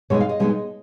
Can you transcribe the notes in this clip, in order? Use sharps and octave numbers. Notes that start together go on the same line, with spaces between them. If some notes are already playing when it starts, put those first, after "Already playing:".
B2 G#3 B3 D#4 C#5
F5
D#5
B2 G#3 B3 D#4